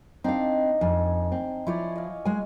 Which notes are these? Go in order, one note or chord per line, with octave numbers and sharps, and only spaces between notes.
C4 D4 D#4 F5
F2 G#5
C4
F3 E4 C#5 D5
D#5 F5
G#3 G#5